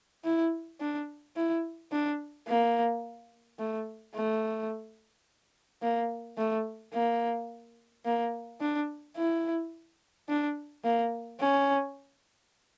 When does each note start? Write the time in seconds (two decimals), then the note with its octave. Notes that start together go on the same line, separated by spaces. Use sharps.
0.24 E4
0.80 D4
1.36 E4
1.92 D4
2.48 A#3
3.59 A3
4.15 A3
5.82 A#3
6.38 A3
6.94 A#3
8.05 A#3
8.61 D4
9.17 E4
10.29 D4
10.84 A#3
11.40 C#4